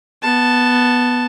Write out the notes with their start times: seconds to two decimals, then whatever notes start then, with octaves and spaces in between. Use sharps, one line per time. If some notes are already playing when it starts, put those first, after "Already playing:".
0.22 B3 A5